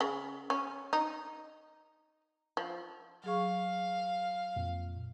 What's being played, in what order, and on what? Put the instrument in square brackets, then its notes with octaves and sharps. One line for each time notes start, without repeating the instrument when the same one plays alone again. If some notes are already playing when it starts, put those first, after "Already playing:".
[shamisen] C#3
C#4
D#4
F3
[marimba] F#3 G#4 C#6 [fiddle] F5
[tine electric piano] F2 A#2